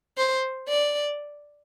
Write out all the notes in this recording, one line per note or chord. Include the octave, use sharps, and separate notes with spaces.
C5
D5